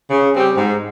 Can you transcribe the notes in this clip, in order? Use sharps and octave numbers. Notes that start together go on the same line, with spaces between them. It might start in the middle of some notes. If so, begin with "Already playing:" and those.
C#3
G3 C4 G4
G#2